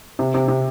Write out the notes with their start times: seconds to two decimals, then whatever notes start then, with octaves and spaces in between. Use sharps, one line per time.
0.19 C3
0.34 C3
0.48 C3